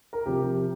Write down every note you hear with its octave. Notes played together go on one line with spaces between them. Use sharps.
A#4
C3 F3 G4